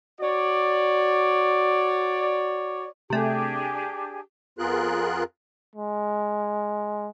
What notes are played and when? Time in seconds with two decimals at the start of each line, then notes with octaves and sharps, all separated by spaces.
0.21 F#4 C#5 D5
3.10 C3 A3 D4 G4 G#4
4.59 F2 B3 F4 G#4 A#4 F#6
5.76 G#3